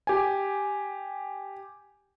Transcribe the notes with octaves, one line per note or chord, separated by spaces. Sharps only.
G4 G#5